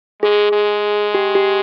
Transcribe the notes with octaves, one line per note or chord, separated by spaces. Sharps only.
G#3 G#4
G#3
G4
G4